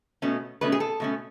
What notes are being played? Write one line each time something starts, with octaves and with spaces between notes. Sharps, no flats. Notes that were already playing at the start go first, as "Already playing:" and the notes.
B2 A3 C#4
B2 A3 C#4 B4
G#4
A4
B2 A3 C#4